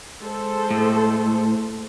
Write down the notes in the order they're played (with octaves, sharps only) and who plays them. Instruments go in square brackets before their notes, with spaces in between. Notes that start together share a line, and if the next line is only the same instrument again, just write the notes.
[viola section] G#3 A4 C5
[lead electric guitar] A2